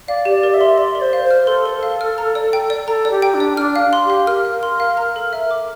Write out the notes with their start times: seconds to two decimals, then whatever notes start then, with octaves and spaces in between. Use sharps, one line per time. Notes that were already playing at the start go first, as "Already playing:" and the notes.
0.08 D5 F5
0.25 G4
0.31 D5
0.43 A#4
0.54 E5
0.61 C6
0.78 D5 C6
0.95 A#4
1.02 C5
1.13 F5
1.24 C5
1.31 F6
1.47 A4 C6
1.66 A#4
1.83 F5
2.01 F6
2.18 A#5
2.35 D5
2.53 G5
2.70 D5
2.87 A4 A#5
3.05 D5
3.11 G4
3.22 G5
3.34 D4
3.40 D5
3.57 D4 F6
3.76 F5
3.93 C6
4.05 G4 F5
4.27 A#4 F6
4.45 F5
4.63 C6
4.80 F5
4.97 A#5
5.16 A4
5.33 E5
5.51 D6